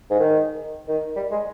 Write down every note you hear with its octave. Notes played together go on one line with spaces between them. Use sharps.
G#2
D#3
D#3
G3
G#3